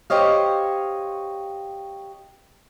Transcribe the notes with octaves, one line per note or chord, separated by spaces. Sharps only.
G4 C5 C#5 D#5 F5